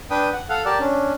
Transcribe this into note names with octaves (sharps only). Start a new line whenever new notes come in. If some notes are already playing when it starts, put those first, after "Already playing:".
D4 B4 G5 D#6
F#5
A4 F5 F#5
G4 A#4 D5 A5
C#4 D4